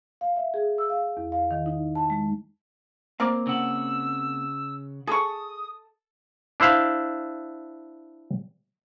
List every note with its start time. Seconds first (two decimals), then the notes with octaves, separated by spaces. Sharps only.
0.21 F5
0.36 E5
0.54 G#4
0.78 E6
0.90 F5
1.17 E2
1.32 F5
1.51 D#3
1.66 D#4
1.95 A5
2.10 G#3
3.20 A#3 C4 A#4 D5 F5
3.47 C#3 F#5 E6
5.07 G#4 A4 C#6 D#6
6.60 D4 E4 C5 F5